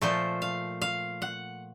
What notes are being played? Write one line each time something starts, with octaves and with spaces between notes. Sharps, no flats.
A#2 F3 A3 C5
F5
F5
F#5